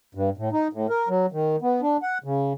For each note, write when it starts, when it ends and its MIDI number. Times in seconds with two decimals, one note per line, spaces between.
0.15 0.30 43
0.37 0.49 45
0.52 0.68 63
0.73 0.87 45
0.89 1.09 70
1.09 1.26 54
1.32 1.56 51
1.62 1.81 59
1.82 1.97 62
2.02 2.18 78
2.24 2.53 49